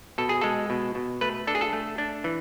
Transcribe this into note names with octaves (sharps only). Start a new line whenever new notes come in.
B2 A4
G#4
G#3 A4
B2
B2
A3 B4
D4 A4
G#4
A4
A3
D4
E3